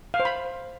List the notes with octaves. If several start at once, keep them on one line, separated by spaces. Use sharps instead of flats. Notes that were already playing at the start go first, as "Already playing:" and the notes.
F5
C5
B5